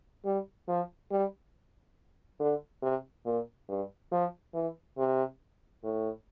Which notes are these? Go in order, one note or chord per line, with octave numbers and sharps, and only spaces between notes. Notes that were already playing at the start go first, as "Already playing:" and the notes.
G3
F3
G3
D3
C3
A#2
G2
F3
E3
C3
A2